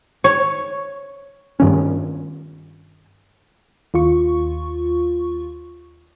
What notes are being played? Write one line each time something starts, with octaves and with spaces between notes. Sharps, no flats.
C#5
G2 D#3 C#4
D#2 F4 C#6